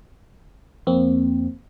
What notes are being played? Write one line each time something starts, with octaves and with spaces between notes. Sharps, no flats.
F2 A#3 C4